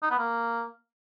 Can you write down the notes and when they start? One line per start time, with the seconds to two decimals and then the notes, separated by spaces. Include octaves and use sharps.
0.03 D#4
0.10 B3
0.18 A#3